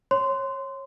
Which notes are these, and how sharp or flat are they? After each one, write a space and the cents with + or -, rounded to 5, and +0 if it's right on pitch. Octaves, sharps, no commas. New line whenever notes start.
C#5 -25 C6 -15